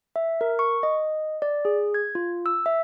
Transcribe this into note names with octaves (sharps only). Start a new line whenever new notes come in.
E5
A#4
C#6
D#5
D5
G#4
G#6
F4
E6
E5